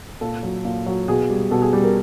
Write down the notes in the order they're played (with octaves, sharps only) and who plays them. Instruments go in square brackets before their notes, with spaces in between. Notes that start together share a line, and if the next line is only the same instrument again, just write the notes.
[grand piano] A#2 A4
F#3
A#2
F#3
B2 G#4
G3
B2 A4
G#4
G3
A#4